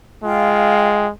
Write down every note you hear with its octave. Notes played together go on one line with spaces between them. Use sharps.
G#3 F4 F5 G5